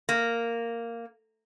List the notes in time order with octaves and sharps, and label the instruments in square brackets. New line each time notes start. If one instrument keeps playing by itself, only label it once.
[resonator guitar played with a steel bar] A#3